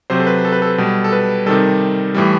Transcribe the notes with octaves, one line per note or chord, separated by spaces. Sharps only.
C3 F#3 C5
A4
B4
A4
B4
A4
B2 G3
A4
B4
C3 D#3 G3 A4
A2 E3 G3